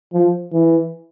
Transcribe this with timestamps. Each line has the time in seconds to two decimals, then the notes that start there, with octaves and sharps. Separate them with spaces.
0.14 F3
0.53 E3